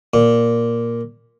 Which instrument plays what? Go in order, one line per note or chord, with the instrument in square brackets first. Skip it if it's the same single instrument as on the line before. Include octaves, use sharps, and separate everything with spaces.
[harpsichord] A#2